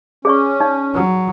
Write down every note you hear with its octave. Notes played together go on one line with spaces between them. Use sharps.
C#4 G#4 D5 C#6
D#4 D5
F#3